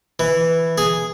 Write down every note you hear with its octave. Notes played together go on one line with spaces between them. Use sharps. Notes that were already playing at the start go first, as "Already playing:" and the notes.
E3
G#4